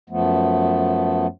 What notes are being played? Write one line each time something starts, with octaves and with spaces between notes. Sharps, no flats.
F#2 F3 A3 B3